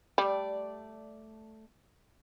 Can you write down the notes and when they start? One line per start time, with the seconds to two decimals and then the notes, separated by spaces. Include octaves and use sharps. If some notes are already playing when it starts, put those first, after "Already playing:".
0.18 G3 A3 D5